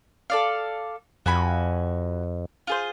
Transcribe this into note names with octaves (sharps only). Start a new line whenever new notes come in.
A4 D5 F5
F2 F#4 G#5 B5
F4 G#4 C5